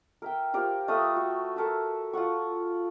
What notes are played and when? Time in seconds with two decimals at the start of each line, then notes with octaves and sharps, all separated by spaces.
0.22 A#4 E5 G5
0.54 F4 G4 A#4 C5
0.88 A3 B4 F5 D#6
1.16 F#4
1.56 A4 A#4 E5 A5
2.13 F4 A4 F#5 C#6